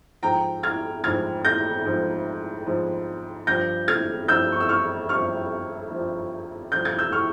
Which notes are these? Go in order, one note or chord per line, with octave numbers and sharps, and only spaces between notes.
G#2 F3 G5 A#5
F6 G#6
G#2 F3 F6 G#6
G6 A#6
G#2 F3
G#2 F3
G2 F3 G6 A#6
F6 G#6
G2 F3 E6 G6
C#6
E6
C#6 F6
G2 F3 C#6 F6
G2 F3
G2 F3 G6
G#6
E6 G6
C#6 F6